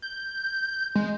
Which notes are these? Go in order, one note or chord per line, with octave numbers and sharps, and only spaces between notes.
G6
G#3